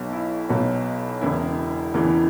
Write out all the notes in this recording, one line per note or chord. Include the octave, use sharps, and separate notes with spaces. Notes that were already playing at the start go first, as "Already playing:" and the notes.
Already playing: B1 B2 F#3
E4
B1 B2 F#3
E1 E2 C#3 E3 E4
E1 E2 C#3 E3